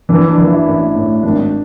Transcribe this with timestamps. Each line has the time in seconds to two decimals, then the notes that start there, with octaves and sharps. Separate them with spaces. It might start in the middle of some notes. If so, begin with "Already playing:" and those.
0.09 E3 D4
0.27 D4
0.38 E3
0.48 E4
0.66 A1
0.95 A2
1.23 G#1 D4